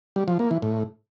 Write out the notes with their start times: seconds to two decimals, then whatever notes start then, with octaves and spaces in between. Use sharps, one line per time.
0.16 G3
0.28 F3
0.39 A#3
0.51 E3
0.62 A2